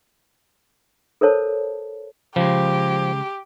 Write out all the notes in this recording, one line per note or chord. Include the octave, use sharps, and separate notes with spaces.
A4 A#4 C5 C#5 A5
C#3 F3 G#3 G4